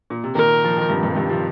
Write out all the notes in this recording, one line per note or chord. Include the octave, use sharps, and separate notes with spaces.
A#2
C3
A#2 D#3 A#4
F3
D#3
G2 C3
G2 C3
D#3
G2 C3
C3 F3